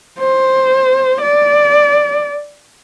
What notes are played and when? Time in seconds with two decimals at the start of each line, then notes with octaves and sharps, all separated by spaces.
0.19 C5
1.21 D5